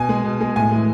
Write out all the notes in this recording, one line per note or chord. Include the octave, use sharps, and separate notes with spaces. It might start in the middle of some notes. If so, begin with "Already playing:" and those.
Already playing: B2 G#5
G#3
B2
G#3
A2 G#5
E3 G#3